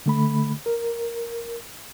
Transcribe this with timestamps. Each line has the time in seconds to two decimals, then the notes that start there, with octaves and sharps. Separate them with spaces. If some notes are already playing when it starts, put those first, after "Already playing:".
0.06 D3 A3 B5
0.66 A#4